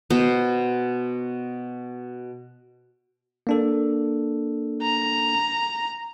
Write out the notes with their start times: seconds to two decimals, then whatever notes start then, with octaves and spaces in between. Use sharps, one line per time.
0.10 B2 B3 C5
3.47 A#3 D4 A4
4.82 A#5